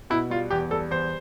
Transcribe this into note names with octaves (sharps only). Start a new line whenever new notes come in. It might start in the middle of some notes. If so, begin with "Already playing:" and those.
B2 E4
G3 F4
E2 G4
G3 A4
E2 C5